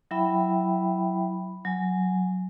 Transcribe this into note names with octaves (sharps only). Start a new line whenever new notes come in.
F#3 E4 E5 G5 B5
F#3 G#5